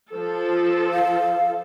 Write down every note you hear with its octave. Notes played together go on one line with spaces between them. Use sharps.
F3 A4
F5